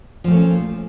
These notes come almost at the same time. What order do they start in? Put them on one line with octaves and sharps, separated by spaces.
F3 A#2 A3 C#4